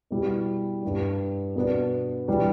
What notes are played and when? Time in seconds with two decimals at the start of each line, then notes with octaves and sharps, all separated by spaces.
0.11 B2 G3 E4 G4
0.83 G2 G3 D4
1.55 B2 B3 D4
2.28 E3 G3 D4 G4